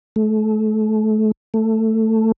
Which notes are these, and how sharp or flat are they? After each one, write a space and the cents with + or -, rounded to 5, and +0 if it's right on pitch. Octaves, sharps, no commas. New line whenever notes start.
A3 -30
A3 +10